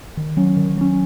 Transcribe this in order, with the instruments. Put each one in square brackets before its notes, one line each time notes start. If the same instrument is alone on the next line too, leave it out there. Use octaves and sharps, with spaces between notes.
[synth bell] D#3
F#3 C#4
D#3
F#3 C#4